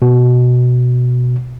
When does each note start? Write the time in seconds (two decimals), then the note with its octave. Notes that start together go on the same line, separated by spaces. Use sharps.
0.02 B2